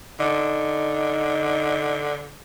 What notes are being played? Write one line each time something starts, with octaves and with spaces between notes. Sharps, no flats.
D3 D#4